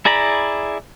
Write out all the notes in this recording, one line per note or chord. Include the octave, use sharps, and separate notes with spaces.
E4 G#4 D5 A#5 B5